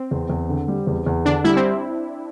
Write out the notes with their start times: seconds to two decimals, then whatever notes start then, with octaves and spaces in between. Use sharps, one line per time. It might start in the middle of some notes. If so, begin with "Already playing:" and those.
Already playing: C4
0.11 E2
0.30 E2
0.49 D3
0.68 G3
0.87 E2
1.06 E2
1.25 D3 D4
1.44 G3 E4
1.56 C4